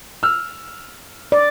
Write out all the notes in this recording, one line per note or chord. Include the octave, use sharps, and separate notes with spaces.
E6 F6
D5